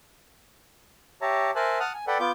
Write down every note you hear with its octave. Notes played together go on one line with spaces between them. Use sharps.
G4 C#5 E5 A5 A#5
A#4 C5 E5 G#5 A5 F#6
F#5 A5 D#6 F6 F#6
G#5
A4 B4 D5 F#5 G5
B3 F4 D6 G6